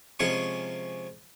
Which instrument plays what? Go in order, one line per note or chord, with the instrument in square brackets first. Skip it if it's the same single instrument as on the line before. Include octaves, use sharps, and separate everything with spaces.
[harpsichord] C3 F3 G#3 C#4 G#5 C#6